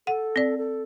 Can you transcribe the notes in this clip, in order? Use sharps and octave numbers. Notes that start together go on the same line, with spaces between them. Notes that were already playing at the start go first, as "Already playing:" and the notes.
A4 F#5
C4 D5
A4